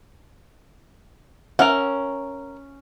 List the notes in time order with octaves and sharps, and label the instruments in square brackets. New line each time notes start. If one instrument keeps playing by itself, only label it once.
[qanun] C#4 [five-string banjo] A#4 E5 F#5